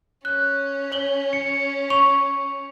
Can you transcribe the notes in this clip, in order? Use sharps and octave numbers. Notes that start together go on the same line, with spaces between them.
C#4 F#6
C#5 F#7 G7
C#7
C#6 F7